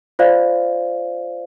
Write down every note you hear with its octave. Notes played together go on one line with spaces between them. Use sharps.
F4 C5 D5 F5